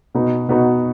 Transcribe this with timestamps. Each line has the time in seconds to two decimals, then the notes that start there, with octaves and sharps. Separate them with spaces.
0.14 B2 B3 D#4 F#4
0.48 B2 B3 D#4 F#4